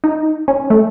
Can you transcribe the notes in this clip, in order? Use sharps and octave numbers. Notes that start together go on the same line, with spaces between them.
D#4
C#4
A3